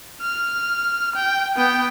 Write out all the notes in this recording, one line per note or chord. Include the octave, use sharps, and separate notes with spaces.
F6
G5
B3 G5